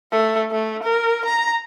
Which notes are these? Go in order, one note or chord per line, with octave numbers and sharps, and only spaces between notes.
A3
A3
A#4
A#5